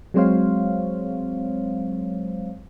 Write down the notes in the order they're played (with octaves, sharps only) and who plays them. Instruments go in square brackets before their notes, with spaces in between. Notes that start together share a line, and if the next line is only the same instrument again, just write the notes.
[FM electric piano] F#3 G#3 C4 C5 C#5 F5